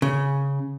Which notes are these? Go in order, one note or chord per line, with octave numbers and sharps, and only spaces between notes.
C#3